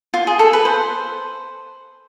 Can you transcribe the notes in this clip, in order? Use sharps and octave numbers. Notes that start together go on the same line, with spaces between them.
F4
G#4
A4
B4
C5